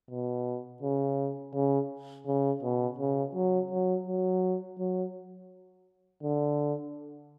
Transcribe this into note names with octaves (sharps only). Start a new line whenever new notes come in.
B2
C#3
C#3
C#3
B2
C#3
F#3
F#3
F#3
F#3
D3